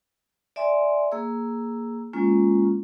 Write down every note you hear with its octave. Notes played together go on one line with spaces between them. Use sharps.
D5 E5 G#5 C6
A#3 G#4 E6
G#3 A#3 C#4 F4